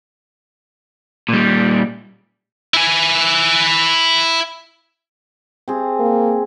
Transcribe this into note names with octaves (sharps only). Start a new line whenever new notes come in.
A#2 G3
E4 G#5
C4 G#4
A#3